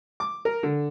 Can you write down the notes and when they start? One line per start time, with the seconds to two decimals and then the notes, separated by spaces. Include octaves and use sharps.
0.20 D6
0.45 A#4
0.63 D3